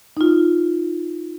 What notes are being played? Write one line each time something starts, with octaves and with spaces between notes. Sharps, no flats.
D#4 F4